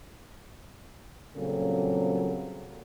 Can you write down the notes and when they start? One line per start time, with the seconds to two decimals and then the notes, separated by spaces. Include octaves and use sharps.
1.36 A#2 C#3 F#3 G3 C4 A4